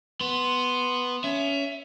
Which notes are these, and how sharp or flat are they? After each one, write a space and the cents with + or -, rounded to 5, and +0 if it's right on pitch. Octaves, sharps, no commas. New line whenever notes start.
B3 +0 C6 +0
C#4 +20 E5 +15